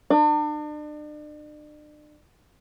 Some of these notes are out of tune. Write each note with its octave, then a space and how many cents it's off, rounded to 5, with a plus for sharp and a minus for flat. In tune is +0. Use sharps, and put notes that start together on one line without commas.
D4 +40